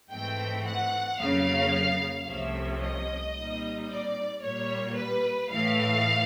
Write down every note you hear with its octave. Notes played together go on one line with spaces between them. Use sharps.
G#2 E3 A3 C4 G5
F#5
F2 C#3 F#3 A#3 F5
C2 C3 F3 A3 C#4 E5
D#5
A#2 G3 C4 D#4
D5
A#2 G3 A#3 C#5
B4
A2 E3 A3 F5